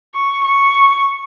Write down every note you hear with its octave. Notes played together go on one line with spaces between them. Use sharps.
C#6
C#6